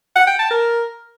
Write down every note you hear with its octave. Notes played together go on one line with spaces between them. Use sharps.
F#5
G5
A5
A#4